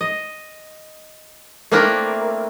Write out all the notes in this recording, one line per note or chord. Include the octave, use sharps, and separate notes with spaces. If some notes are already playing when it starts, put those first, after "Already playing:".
D#5
A3 A#3 C4 D4 E4 A#4